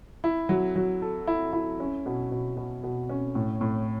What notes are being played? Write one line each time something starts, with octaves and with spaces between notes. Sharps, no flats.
E4
F#3
F#3
A4
E4
E4
C#4
B2
B2
B2
B2
C#4
A2
A2